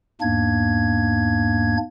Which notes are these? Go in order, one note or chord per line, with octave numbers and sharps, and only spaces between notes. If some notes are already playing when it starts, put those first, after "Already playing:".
E2 G#2 A#3 D4 G#6